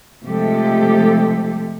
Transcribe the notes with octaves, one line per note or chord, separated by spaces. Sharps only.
C3 F3 G#3 A3 G4 A4